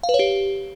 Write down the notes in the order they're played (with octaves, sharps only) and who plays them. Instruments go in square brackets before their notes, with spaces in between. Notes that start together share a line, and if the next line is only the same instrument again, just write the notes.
[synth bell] F5
B4
C#5
G4